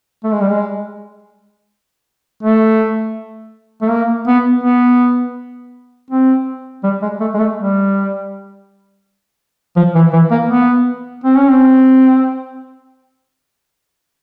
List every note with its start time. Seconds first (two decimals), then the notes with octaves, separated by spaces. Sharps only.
0.24 A3
0.33 G#3
0.41 G3
0.50 G#3
2.43 A3
3.82 A3
3.90 A#3
4.27 B3
4.64 B3
6.10 C4
6.84 G3
7.02 G#3
7.20 A3
7.34 G#3
7.39 A3
7.56 G3
9.76 F3
9.95 E3
10.13 E3
10.31 A#3
10.49 B3
11.24 C4
11.37 C#4
11.50 C4